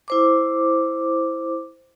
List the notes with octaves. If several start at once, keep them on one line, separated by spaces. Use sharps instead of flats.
E4 C5 D6